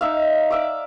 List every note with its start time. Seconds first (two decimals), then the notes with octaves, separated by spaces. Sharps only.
0.01 D#4 E5 F5
0.51 D5 E5 D6